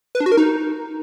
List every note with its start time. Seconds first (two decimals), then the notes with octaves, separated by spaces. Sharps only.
0.15 B4
0.20 D4
0.26 F#4
0.32 A#4
0.37 D#4